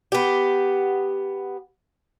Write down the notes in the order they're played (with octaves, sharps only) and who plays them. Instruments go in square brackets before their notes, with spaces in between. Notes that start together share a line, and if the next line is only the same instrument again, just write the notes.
[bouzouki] B3 G4